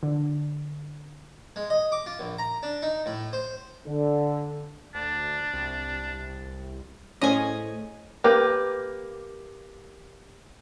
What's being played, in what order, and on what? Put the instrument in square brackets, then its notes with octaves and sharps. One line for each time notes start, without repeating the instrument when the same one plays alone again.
[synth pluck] D3
[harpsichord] G#3
D#5
D6
F4
A#1
A#5
D4
D#4
A2
C5
[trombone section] D3
[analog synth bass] D2 [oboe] D4
[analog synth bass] C2
[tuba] A2 [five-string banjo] C#4 G#4 C5 [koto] D#5 G#5
[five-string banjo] A#3 G4 B4